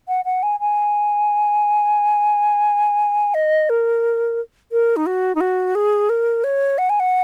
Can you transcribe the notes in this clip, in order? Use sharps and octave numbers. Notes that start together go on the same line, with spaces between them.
F#5
F#5
G#5
G#5
D#5
A#4
A#4
D#4
F#4
D#4
F#4
G#4
A#4
C#5
F#5
G#5
F#5